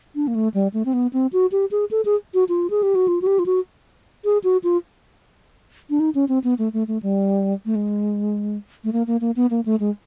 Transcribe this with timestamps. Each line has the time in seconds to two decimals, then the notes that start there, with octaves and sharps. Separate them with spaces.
0.15 D4
0.27 A#3
0.35 A3
0.54 G3
0.74 A3
0.85 C4
0.93 B3
1.13 C4
1.33 F#4
1.52 G4
1.71 G#4
1.91 A4
2.05 G#4
2.34 F#4
2.49 F4
2.70 G#4
2.83 G4
2.95 F#4
3.08 F4
3.22 F#4
3.27 G4
3.39 F4
3.46 F#4
4.25 G#4
4.44 F#4
4.64 F4
5.90 D4
6.00 D#4
6.15 C#4
6.29 C4
6.44 B3
6.58 A3
6.73 A3
6.88 A3
7.03 G3
7.65 A3
7.75 G#3
8.84 A3
8.93 A#3
9.07 A#3
9.21 A#3
9.36 B3
9.50 A#3
9.66 A3
9.80 G#3